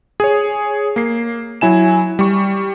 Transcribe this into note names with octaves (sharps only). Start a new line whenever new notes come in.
G#4 C#5
A#3 C7
F#3 E4 G#5 E7
G3 C#6